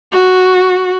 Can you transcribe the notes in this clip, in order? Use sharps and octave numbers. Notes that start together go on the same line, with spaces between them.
F#4